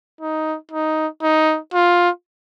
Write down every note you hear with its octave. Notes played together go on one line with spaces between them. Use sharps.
D#4
D#4
D#4
F4